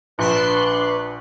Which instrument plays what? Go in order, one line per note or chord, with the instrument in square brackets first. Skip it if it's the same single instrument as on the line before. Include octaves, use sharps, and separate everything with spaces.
[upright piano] A#1 [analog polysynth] D4 C6 F#6 [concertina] B4